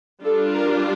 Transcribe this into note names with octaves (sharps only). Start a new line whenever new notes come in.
G3 D4 F4 A4
A#4